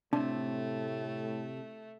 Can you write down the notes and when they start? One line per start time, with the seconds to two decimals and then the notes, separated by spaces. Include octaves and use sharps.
0.13 A2 C3 A3 D4